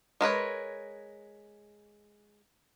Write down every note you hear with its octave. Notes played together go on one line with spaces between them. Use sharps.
G#3 A#4 B4 C#5